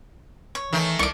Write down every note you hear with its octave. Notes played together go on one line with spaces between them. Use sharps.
C#5
D#3 E3 A3
C2 C#6 D6